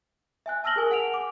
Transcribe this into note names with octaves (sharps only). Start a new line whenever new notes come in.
E5 G#5 F#6
A5 E6 F6 A#6 F#7 G7
G#4 A#4 G#5
F#5 G#5 D7 F7
D6